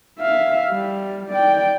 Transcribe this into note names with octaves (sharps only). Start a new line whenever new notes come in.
E5 F5
G3
D5 G5